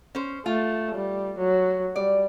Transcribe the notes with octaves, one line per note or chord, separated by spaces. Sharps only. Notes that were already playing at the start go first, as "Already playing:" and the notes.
C#4 C5
A3 F4
G3
F#3
G3 D5